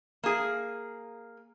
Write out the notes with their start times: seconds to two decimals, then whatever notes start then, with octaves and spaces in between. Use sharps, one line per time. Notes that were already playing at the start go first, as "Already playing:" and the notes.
0.23 A#3 G#4